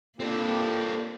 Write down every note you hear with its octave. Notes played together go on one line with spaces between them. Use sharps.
A#3 C4 D4 F4 G4 A4